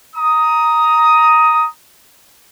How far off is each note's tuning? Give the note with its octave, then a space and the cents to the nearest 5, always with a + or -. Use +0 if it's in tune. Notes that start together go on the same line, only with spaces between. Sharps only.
A#5 +0 D#6 +10